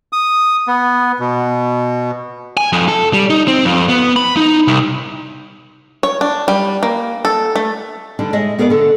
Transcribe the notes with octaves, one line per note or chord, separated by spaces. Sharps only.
D#6
B3
B2
G#5
F2
A4
G3
D#4
C4
F2
B3
B5
D#4
C2
C#5
D4
G3
A#3
A4
A3
D3 G3 D4
G#3 G#4 C#5 D#5 E5
B3 G#4 A#4 C#5 D5
D3 A4